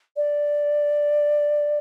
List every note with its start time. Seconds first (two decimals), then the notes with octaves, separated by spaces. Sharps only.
0.16 D5